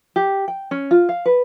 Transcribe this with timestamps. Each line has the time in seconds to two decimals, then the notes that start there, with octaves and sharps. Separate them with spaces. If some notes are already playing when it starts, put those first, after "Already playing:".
0.16 G4
0.48 G5
0.71 C#4
0.91 F4
1.09 F5
1.26 B4